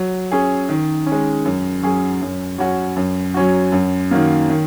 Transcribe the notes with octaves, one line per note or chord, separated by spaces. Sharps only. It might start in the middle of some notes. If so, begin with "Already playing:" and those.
Already playing: F#3
C#4 G#4
D#3
C#4
G#3
F#2
F#3 C#4 G#4
F#2
F#3 C#4 F#4
F#2
F#3 C#4 F#4
F#2
D#3 F#3 A#3
D#3